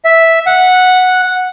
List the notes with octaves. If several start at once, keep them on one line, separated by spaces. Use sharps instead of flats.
E5
F#5